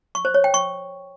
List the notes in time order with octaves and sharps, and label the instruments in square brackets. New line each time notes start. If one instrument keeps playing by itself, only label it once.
[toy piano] C#6
C5
C#5
G5
C#6